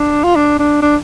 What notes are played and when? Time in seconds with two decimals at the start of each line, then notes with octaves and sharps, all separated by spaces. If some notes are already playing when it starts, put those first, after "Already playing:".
Already playing: D4
0.24 F4
0.36 D4
0.59 D4
0.82 D4